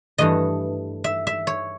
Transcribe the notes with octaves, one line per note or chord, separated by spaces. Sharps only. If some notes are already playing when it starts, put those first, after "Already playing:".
G2 E3 A3 D#5
E5
E5
C#5